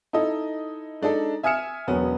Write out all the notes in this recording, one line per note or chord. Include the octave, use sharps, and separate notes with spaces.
D#4 E4 A4 D#5
G#3 D4 D#4 A4
E5 G#5 D#6 F6 C#7 E7
E1 F#3 B3 C#4